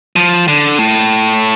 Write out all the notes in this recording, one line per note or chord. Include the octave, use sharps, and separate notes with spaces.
F3
D3
A2